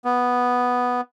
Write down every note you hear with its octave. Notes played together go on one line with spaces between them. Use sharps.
B3